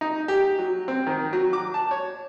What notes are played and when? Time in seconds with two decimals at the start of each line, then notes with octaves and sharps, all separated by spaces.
0.01 D#4
0.28 G4
0.59 F#3
0.88 C4
1.07 D#3
1.33 F#3
1.53 D6
1.74 A5
1.91 C#5